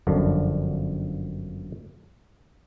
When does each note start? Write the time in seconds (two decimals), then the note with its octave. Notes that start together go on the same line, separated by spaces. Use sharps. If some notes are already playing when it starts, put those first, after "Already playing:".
0.07 G1 F#2 D3 F3 D4